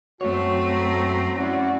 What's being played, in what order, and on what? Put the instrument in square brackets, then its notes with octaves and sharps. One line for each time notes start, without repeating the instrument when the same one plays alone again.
[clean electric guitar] F#2 C#5 [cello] A3 C4 [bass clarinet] F#4
[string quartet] A#5
[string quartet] C#4 F#4 D5 [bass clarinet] E4